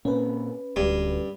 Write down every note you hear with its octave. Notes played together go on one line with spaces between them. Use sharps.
A#2 A#3 C4 C#4 B4
D1 D2 G2